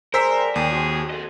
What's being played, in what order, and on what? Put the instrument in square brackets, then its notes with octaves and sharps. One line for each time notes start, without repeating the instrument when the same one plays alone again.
[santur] G#3 D5 [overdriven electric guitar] A#4 [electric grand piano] C5 E6 B6
[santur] G5
[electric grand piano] D#2 [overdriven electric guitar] G#4 [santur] G5 A5 D#6
[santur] C4 F#4
[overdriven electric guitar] A4 D#5